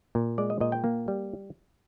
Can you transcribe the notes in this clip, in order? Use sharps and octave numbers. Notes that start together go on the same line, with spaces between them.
A#2
G#3 D5
D#5
A#2 D#5
G5
A#3
G3